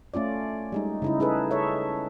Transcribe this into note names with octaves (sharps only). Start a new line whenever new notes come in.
A3 C#4 F4 D5
G3 G#3 D#4
C#3 D#4 E4
D#4 G#4 A4 B4
A4 C#5 E5